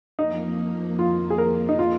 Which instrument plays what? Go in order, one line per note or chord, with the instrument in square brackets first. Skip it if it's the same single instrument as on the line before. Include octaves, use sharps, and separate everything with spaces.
[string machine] F2 F3 A#3 [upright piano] D#4
[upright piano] F4
G#4
A#4
D#4
F4